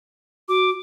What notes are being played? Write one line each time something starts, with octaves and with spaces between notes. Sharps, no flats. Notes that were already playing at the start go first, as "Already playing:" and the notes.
F#4 D6